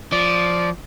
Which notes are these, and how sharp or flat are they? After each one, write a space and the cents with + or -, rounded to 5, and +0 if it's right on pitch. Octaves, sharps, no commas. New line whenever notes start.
F3 +0 D5 -10